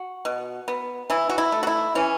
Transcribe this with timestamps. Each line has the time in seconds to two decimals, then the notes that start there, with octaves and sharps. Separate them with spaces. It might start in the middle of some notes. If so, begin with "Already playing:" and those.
Already playing: F#4
0.25 B2
0.68 B3
1.10 E3 E4
1.30 F#4
1.38 E4
1.52 A3
1.63 F#4
1.67 E4
1.95 E3 C#4